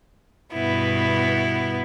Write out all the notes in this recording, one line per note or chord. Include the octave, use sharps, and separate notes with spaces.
G2 B2 B3 E4